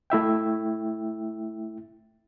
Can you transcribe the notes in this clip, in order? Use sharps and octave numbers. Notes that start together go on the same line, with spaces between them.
A3 E4 E5 G5